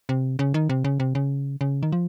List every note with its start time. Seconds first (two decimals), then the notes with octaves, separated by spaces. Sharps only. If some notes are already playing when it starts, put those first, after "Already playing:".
0.09 C3
0.39 C#3
0.54 D#3
0.69 C3
0.84 C#3
1.00 C3
1.15 C#3
1.61 C#3
1.83 D#3
1.92 F3